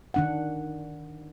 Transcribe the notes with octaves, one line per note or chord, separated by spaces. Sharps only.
D#3 D4 F#5